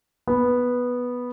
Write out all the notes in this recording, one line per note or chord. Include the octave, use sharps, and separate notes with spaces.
B3